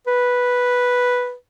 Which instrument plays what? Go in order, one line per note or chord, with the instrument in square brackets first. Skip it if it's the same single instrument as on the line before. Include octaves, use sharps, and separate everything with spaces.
[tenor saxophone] B4